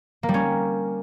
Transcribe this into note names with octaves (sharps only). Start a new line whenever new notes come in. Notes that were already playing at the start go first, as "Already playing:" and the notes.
A#3
G3
C#4